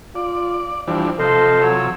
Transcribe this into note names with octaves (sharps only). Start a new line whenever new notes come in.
F4 D5
E3 F3 G3 D4
C3 F3 A4 C5 D#5 F5
F#3 C#5 E6